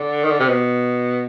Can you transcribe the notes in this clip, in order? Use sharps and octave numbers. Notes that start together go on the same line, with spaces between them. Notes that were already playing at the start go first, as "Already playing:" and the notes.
Already playing: D3
D#3
D3
C3
B2